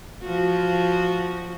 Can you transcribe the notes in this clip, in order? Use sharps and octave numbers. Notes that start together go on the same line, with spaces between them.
F3 F#4